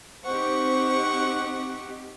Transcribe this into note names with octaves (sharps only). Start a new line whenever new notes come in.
C4 D#4 G4 C5 F#5 C#6